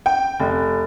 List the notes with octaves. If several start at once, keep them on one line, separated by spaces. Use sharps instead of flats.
G5
F1